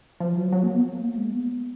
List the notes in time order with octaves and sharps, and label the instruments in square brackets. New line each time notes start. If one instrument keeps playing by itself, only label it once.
[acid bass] F3
F#3
F#3
A#3
B3
A#3
G#3
B3